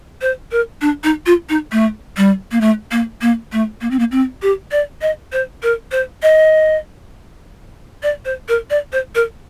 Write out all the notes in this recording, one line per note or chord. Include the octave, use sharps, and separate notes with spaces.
C5
A#4
D4
D#4
F4
D#4
A3
G3
A#3
A3
A#3
A#3
A3
A#3
C4
A#3
C4
G4
D5
D#5
C5
A#4
C5
D#5
D5
C5
A#4
D5
C5
A#4